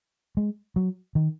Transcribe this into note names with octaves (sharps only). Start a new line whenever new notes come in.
G#3
F#3
D#3